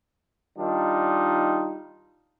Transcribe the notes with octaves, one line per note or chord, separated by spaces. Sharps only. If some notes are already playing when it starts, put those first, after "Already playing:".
D#3 G3 D4 D#4 F4